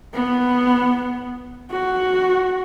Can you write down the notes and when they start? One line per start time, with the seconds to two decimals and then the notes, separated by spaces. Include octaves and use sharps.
0.14 B3
1.71 F#4